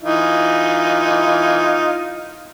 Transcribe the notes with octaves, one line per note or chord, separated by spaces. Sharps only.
E3 D#4 F4